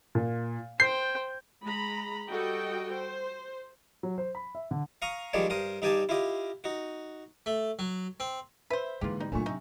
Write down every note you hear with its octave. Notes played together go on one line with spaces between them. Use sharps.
A#2
C5 G5 G6 C7
G#3 A#5 B5
G3 F#4 A4 D#5 G5
C5
F#3
C5
B5
E5
D3
F5 A#5 C#6 D#6
D#3 F3 G3 G#3 C#5 D5
G2 A#4 C5 D#6
G2 D#4 G4 D5 G#5 A5
E4 F4 G4 D#5
D#4 F#4
A3
F#3
C4
B4 C5 E5
G#2 D3 E3 A#3 F4 G4
G3 D#4
A#2 D3 F#3 A3 D4 G#5 C#6
C3 D#4 E5